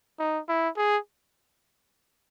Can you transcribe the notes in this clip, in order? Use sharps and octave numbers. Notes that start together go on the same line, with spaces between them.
D#4
E4
G#4